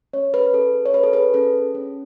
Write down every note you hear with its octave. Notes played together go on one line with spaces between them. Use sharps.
C#4 C#5
G#4 B4
C#4 A4
G#4
C#5
C#4 B4
A4
G#4 B4
C#4 A4
G#4
C#4